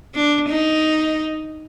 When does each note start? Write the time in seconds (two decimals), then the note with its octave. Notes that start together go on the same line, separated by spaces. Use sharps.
0.15 D4
0.49 D#4